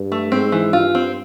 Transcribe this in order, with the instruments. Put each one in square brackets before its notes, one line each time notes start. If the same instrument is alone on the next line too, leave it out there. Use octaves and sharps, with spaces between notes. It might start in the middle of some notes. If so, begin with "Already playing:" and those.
Already playing: [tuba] G2
[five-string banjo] A3
[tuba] G#2 [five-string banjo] C4
[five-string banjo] E3
[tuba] G2 [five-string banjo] F4
[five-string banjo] C4